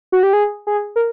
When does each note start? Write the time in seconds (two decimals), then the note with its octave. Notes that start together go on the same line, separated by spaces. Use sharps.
0.12 F#4
0.23 G4
0.33 G#4
0.67 G#4
0.96 A#4